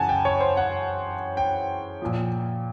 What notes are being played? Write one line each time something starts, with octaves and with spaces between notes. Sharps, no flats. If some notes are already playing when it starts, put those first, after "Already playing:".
Already playing: F#2 C#3 E3 F#5 G#5 A5
G5
C#5
C5
F#5
G5
A#2 F3